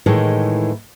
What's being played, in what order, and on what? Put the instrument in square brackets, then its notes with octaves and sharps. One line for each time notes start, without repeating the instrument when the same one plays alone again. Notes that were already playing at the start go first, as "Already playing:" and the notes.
[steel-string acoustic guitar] A2 D#3 E3 G#3